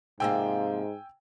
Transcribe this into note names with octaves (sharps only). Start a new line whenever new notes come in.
G#2 C3 F3 A#3 G5 G#5 E6